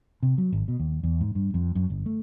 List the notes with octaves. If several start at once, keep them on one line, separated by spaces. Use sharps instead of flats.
C3
F#3
G#1
B2
D#2
E2
G#2
G2
F2
F#2
G1
A3